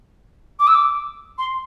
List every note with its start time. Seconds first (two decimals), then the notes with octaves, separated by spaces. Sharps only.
0.60 D6
0.67 E6
0.75 D6
1.38 C6